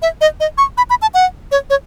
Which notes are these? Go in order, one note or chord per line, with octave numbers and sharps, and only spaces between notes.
E5
D#5
D#5
C#6
B5
B5
A5
F#5
C#5
C#5